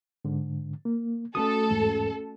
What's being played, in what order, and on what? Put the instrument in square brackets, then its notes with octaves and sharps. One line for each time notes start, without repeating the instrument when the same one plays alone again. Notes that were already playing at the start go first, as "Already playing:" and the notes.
[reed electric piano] G#2 D3
A#3
[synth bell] A3 C#4 F#4 [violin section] A4 [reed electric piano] D#6
[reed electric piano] E2 G#2